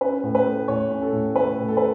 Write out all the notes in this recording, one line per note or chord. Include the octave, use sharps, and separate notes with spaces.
C#4 B4
A2
B4
A3
A2 C#5
C#4
A4
A2
A3 B4
A2
A4
B4